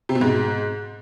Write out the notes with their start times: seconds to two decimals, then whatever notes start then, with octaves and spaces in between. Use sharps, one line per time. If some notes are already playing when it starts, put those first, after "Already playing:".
0.09 C3
0.15 B2
0.21 G#2